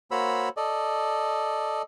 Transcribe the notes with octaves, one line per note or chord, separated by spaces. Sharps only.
A#3 F#4 C5 C#5 B5 E6
A4 D5 D#5